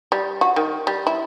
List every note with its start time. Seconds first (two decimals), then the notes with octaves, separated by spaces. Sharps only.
0.12 G3
0.41 F#4
0.56 D#3
0.87 G3
1.07 E4